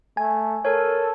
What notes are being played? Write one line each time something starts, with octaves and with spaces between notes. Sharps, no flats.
A3 G#5
A4 A#4 C#5